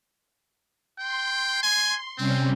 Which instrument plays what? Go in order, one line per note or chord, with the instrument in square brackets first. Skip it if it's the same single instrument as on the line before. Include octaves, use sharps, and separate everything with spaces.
[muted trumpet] G5 [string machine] C6
[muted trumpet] G#5
[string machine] C3 G3 C#4 [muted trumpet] C4